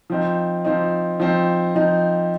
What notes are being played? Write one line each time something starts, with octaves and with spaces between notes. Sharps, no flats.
F3 C4 D#4
F3 C4 D#4
F3 C4 D#4
F3 C4 D#4